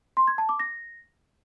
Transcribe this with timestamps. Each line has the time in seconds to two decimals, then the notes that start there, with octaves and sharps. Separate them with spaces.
0.17 C6
0.28 G#6
0.38 A5
0.49 D6
0.60 A#6